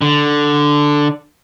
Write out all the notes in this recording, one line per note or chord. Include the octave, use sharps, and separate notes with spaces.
D3